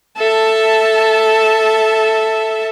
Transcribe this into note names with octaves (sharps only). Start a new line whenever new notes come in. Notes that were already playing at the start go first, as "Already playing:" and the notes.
A4 E5 A5